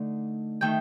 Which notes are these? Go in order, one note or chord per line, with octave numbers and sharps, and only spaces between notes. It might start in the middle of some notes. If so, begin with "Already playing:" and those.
Already playing: D3 A3 D#4
D#3 A3 G5